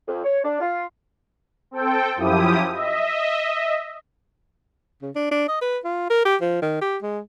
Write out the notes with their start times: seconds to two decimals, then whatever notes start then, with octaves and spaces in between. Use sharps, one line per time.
0.07 F2
0.24 C#5
0.43 D4
0.60 F4
1.71 C4 A4 G5
2.16 F#2 F3 E4 G4 D#6
2.72 D#5 E5
5.02 C#3
5.15 D4
5.31 D4
5.49 D#5
5.62 B4
5.84 F4
6.10 A#4
6.25 G4
6.41 F3
6.62 D#3
6.82 G4
7.02 G#3